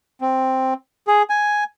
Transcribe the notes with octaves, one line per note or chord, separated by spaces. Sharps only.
C4
G#4
G#5